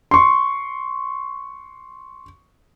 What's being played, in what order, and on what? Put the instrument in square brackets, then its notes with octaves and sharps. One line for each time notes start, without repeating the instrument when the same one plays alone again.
[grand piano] C6 C#6